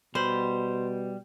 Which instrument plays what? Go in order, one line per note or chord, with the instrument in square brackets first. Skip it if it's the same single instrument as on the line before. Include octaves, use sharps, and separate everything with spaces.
[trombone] B2 [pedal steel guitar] G3 B5 [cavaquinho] C5